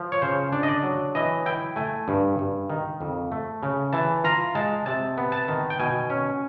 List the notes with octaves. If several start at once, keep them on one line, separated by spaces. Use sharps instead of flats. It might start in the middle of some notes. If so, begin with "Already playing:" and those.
Already playing: F3
C#5
C#3 C5
D4
D#5
D5
F#3
E3 D#5
E4 G5
A3 G#5
G2
G2
D#3
F2
A3
C#3
E3 A5
F4 A#5
G#3 A5
C3 A5
B3
A5
D#3
G5
B2 G#5
C#4